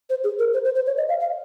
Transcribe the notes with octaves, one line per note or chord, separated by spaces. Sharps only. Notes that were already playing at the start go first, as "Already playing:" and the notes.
C5
G#4
A#4
C5
C5
C5
C#5
D#5
F5
F5